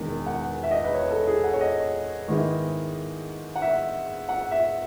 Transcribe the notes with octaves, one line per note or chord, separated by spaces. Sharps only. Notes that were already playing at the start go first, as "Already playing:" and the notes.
Already playing: E1 E2 D#3
F#5
E5
D#5
B4
C#5
A4
G#4
F#5
C#5
D#5
G#2 D#3 G#3 B3 E4
F#5
E5
F#5
E5